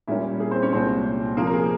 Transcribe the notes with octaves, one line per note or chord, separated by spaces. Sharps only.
A#2 G3 A#3 C#4 E4 E5
G#4
C4 C5
C#4 C#5
C2 A#2 G#3 C4 C#4 C5
C3 F3 A#3 A#4
A#4
G#4